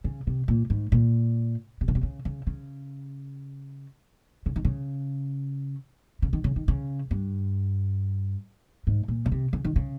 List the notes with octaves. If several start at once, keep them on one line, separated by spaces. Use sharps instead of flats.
C#3
C3
A#2
G#2
A#2
C3
C#3
C3
C#3
C#3
C#3
C#3
D#3
C#3
C#3
D#3
C#3
D#3
C#3
G2
G#2
A#2
C#3
C3
C#3
D#3
C#3